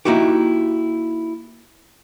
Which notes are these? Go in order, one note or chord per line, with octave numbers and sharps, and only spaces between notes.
A#3 D#4 E4 F#4 G4